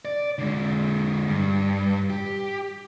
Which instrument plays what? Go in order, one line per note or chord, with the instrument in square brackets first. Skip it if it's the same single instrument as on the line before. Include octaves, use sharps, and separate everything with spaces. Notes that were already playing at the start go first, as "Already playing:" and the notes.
[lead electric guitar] D5
D3 G#3
G2
G4